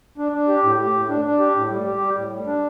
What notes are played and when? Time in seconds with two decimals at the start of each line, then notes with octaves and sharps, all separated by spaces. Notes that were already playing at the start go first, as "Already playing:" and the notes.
0.18 D4
0.32 D4
0.48 G4
0.63 A2
0.78 G4
0.93 A2
1.09 D4
1.25 D4
1.39 G4
1.55 A2
1.70 G3
1.86 G4
2.01 G3
2.16 A2
2.32 G3
2.47 D4